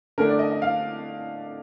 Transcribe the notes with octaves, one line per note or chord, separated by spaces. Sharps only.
D3 A3 D4 A#4
D5
D#5
D#5
F5